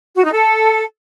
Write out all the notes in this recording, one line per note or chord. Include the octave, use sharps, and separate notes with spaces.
F#4
D#4
A4